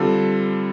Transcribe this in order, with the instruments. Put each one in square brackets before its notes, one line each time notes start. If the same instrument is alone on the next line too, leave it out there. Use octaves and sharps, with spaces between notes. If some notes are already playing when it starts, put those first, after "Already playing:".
Already playing: [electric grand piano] D3 G3 C4 F4 A4